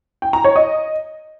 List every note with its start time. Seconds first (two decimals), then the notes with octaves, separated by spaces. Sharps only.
0.22 G5
0.33 A#5
0.44 C#5
0.56 D#5